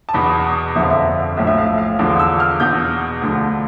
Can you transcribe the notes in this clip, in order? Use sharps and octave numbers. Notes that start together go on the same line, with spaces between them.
A5
E2 B2 B5
G1 F2 D3 F3 E5
F5
E5
B1 A2 F3 E5
E5
F5
F5
E2 D3 F3
E6
F6
E2 B2 G6
D2 D3 F3